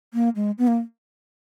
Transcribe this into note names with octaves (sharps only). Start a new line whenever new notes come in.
A#3
G#3
B3
A#3